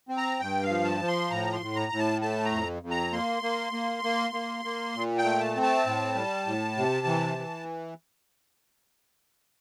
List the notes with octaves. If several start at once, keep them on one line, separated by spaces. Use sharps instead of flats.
C4
A#5
G2 G5
F5
F3
A5
F3
C6
A2 A#5
C6
A2
A#5
A2
A5
A3 A5
A#5
F2
F2
A#5
A#3 C6
A#3
A#3
A#3
A#3
A#3
A#2
G5
A3
A5
C4
A5
A2
G3
A2
C3
E3
E3